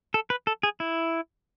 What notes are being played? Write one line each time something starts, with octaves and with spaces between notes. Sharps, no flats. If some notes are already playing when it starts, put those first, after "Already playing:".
A4
B4
A4
G#4
E4